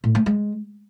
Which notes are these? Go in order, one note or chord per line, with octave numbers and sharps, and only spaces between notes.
A2
A3
G#3